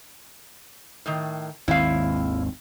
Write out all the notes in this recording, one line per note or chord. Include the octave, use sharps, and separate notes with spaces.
A2 D#3
G#1 D#2 C4 E4 F5